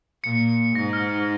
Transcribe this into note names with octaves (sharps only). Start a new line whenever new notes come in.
A#2 C#7
G#2 A#6
F6